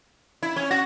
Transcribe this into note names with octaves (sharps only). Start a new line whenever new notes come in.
E4
C#4
F#4 A#6